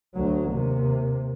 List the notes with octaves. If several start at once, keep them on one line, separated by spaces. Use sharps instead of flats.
D2 F#3
D#2 C3